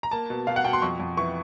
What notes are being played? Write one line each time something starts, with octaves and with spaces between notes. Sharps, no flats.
A#5
A#3 A5
B2
B2 F5
F#5
B2 G5
C6
F2 C#6
F2
E3 C#6